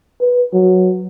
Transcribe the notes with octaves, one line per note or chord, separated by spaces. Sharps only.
B4
F#3